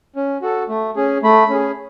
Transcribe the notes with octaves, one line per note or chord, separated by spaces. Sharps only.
C#4
F#4 A4
A3
C#4 G#4
A3 B5
C#4 G#4